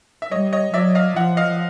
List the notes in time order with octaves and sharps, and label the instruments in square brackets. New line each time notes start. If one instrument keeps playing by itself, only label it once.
[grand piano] E5
[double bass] G3 [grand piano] C#5 D#5
[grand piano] C#5 D#5
[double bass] F#3 [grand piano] D5 E5
[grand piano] D#5 F5
[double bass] F3 [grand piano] E5 F#5
[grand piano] D#5 F5